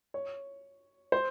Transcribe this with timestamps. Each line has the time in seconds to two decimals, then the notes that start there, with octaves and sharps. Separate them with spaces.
0.14 C#5
1.12 C5